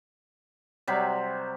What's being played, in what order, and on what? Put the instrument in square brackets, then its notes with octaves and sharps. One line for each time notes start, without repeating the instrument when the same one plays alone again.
[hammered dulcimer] C3 F#3 G3 B5